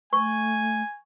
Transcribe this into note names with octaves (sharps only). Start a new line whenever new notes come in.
A3 G#5 C#6